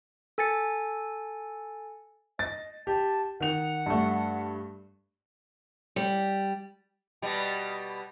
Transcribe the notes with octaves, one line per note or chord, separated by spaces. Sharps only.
A4 G#5 A6 C#7
D#5 A6
G4 A5
D#3 F#5 F7
G2 A3
G3
B2 G3